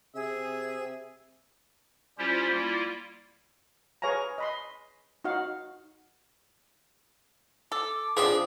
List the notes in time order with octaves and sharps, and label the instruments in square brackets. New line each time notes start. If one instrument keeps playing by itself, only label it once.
[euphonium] C3 [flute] G#4 [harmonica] E5
[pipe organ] G3 C#4 E4 F4 G4 C5
G3 A#3 E4 F4
[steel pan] G#4 B4 C#5 F5 G#5 A#5
D#5 B5 C6
D#4 F#4 F5 F#5
[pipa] A4 [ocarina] D6
[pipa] F3 C4 D4 [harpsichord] G#4 E5